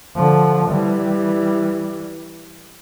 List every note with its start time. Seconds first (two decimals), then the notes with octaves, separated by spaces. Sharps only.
0.16 D3 F3
0.69 E3 G3